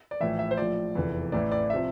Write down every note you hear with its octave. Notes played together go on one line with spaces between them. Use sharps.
D5
A#1 A2 E3 E5
E5
C5
A#1 A2 F3 D5
F1 E2 E3
A1 A2 E3 D5
D5
C3 F3 E5